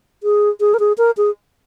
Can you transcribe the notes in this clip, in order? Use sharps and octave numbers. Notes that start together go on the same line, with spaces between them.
G#4
G#4
A#4
G#4
A#4
G#4